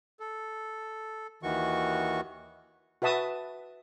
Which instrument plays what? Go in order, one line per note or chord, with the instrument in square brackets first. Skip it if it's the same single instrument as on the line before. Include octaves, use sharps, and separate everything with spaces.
[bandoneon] A4
D#2 D#3 E3 F#4 C#6
[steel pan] F#4 B4 E5 A5 D#6